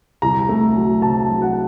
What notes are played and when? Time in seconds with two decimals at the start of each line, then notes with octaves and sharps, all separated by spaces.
0.22 C2 A#5
0.49 A3
0.75 F#3
1.02 C3 A5
1.29 F#3
1.42 F#5